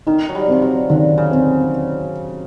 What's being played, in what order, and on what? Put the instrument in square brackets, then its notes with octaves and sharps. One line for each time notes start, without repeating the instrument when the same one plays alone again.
[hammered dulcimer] D#3 [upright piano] D#4
[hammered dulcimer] F#3
G3
[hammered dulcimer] F3 [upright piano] C4
[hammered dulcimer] F#3
[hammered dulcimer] D3 [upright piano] D#3
[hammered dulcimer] C#3
[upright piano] C4